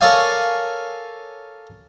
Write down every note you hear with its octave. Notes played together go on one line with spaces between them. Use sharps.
A4 A#4 C#5 D5 F5 G#5